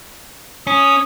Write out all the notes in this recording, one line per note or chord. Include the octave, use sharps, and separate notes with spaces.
C#4 D#6